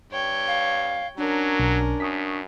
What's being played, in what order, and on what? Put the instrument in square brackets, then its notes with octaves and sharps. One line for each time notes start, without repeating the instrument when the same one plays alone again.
[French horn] G2 [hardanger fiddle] C#5 G5
[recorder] F5
[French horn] F#3 [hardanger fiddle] C#4 A#4 [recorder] D4
[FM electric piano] B1
[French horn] F#2 [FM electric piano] C#6 D#6 B6